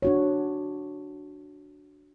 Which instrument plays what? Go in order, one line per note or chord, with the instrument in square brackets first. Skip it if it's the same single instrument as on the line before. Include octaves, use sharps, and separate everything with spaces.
[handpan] D4 F#4 C#5